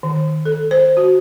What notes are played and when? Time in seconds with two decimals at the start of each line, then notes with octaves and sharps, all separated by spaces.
0.03 D#3
0.45 A4
0.71 C5
0.97 F#4